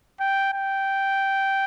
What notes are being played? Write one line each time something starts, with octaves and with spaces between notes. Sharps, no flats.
G5
G5